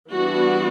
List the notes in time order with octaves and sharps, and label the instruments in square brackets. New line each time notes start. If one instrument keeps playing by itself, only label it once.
[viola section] E3 G3 B3 D4 F#4